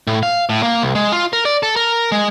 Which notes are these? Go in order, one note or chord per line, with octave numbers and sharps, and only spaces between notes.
A2
F5
A2
A#3
C2
G#3
F4
A#4
D5
A4
A#4
G#3